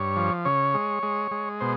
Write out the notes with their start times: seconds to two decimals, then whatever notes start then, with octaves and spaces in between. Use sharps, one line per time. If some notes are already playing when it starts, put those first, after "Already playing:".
Already playing: G2 C#5
0.17 F3
0.45 C#3 C#5
0.74 G#3
1.03 G#3
1.31 G#3
1.60 B2 C5